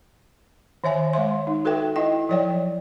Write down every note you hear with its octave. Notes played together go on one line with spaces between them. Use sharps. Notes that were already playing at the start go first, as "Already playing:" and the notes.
D#3 C#5 E5 G#5
G#3 C#5 E5 C6
D#4
F#4 A4 B4 E5 G5
E4 D#5 G5
F3 F#3 C#5 D5 G5